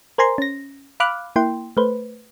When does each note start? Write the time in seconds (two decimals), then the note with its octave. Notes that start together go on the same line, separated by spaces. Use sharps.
0.18 A#4 C5 G#5 A#5 C6
0.38 C#4 A#6
1.00 F5 B5 D6 F6 F#6
1.36 A#3 E4 G5 C6
1.77 A3 B4 C5